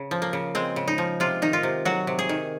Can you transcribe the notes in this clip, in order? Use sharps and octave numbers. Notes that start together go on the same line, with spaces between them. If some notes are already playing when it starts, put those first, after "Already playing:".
Already playing: C#3
F3
A#3
C#3
G#3 C4
C#3
D#4
F3
C3 F4
D#3 D#4
F4
C3
F#3 F#4
C3
G#4
D#3